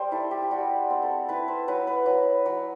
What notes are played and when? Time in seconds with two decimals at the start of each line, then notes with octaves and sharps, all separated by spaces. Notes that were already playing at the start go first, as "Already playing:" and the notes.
Already playing: G3 C5
0.12 E4 A4
0.31 G4
0.42 G4
0.51 G3 F#4
0.90 C4
1.02 A4
1.28 E4 B4
1.48 C5
1.68 F#3 B4
1.87 B4
2.06 F#3
2.46 F#3